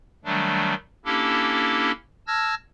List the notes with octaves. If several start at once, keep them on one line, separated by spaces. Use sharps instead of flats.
D#3 F#3 G3 A3 D4
A#3 C#4 D4 E4 G4 A4
A5 E6 F6 G#6 A#6